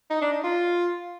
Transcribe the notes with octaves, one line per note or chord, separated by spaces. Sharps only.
D#4
D4
D#4
F4